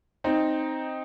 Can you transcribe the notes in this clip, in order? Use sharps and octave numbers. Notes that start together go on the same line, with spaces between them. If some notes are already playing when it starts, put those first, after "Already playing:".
C4 D#4